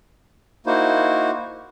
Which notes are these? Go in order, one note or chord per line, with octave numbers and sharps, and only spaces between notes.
A#3 D#4 E4 F#4 C5